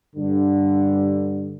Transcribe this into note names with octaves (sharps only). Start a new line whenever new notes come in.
G2 D3